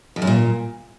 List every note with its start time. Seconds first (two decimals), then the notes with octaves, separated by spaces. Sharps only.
0.16 F2
0.22 F#2
0.27 A#2